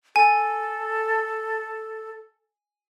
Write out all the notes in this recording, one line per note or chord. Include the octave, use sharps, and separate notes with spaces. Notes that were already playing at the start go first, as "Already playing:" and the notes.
A4 G#5